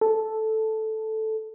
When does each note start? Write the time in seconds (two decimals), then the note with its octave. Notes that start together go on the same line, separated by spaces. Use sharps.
0.01 A4